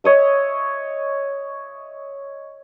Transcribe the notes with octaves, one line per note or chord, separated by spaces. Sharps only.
C#5 D#5 E5